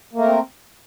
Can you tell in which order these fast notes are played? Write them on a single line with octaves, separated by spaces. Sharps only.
A#3 A3 A#4 C4